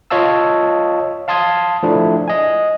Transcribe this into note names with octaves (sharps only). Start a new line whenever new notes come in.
F4 C#5 D#5 F5 A5 E6
F5 A5 C6 D#6 G#6
F3 A3 D4 E4
D#5 G#5